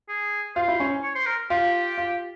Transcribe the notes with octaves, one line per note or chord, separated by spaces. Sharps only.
G#4
F4 C5
E4
C#4
C#5
C5
A#4
F4 G4
F4